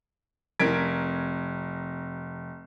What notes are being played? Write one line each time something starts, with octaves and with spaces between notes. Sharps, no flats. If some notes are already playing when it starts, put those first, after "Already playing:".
F1 A#4 G#6 B6 D7